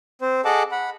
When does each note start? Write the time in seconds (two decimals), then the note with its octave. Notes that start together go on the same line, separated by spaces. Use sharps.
0.22 C4 C5
0.45 G#4 A4 D#5 F#5 A5 D6
0.71 F#5 B5